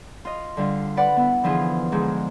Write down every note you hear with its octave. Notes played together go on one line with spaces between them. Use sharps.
F4 D#5
D3 G3 F4 F5
B4 D5 F#5
B3 E4
D3 E3 F3 E4 F4 G#4
G#2 D3 F3 G#3